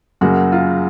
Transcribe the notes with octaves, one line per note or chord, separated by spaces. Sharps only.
F#2 C#3 F#3 A#3 F#4
F4